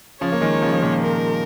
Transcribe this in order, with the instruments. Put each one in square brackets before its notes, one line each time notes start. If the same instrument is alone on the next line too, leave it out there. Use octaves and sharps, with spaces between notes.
[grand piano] C#3 F3 [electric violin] C#5
[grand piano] A#3
D#3 G#3
C#3 F3
F3
A#2 D#3
[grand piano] C#3 [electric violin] A#4